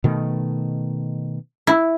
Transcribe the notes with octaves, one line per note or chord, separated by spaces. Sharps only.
B2 D#3 A3
E4